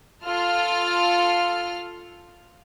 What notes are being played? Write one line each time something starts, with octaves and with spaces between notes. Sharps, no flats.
F4 A4 F6